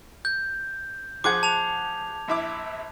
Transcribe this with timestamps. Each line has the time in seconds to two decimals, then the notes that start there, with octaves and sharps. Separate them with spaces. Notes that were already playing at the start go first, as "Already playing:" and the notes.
0.25 G6
1.24 F3 G#4 F#5 D6 G#6
1.43 A5 F7
2.28 A#1 E4 D6